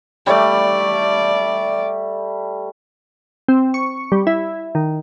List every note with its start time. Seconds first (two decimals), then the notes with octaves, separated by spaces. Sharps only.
0.27 G3 A3 D5
3.48 C4
3.74 C#6
4.12 G3
4.27 E4
4.75 D#3